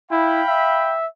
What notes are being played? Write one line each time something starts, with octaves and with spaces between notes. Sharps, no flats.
E4 F5 G5 B5
E5